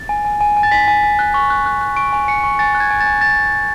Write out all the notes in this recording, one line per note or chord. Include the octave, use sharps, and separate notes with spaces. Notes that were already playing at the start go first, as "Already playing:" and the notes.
Already playing: A6
G#5
G#5
G#5
G#5
A6
G#5 B6
G#5
G#5
F#6
C#6
F#6
F#6
F#6
C#6 D7
G#5
G#5 C#7
C#6
G#5 A6
F#6
G#6
G#5
A6
G#5
A6